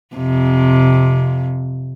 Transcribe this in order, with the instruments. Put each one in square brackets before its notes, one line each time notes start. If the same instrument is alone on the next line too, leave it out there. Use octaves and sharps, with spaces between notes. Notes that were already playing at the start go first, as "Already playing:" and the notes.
[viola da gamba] F2 C3